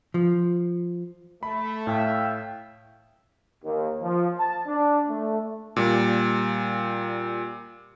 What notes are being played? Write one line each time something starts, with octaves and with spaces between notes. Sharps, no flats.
F3
A3 B5
A2 E5 F5 G5
D#2
F3
A5
D4
A3
A#2 G3